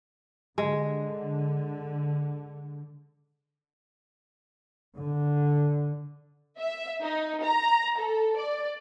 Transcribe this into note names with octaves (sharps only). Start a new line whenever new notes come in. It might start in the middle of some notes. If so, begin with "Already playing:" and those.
D3 G#3
D3
E5
D#4
A#5
A4
D5